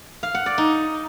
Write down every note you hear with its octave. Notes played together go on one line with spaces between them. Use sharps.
F5
F#5
D5
D#4